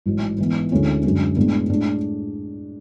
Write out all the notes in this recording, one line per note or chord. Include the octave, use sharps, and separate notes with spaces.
A1 G#2 F#3
G#2 E3 B3
D2 D3 G#3 C#4 E4
F#2 D3 G#3 C#4
A2 G#3 B3 D4
A2 G#3 D4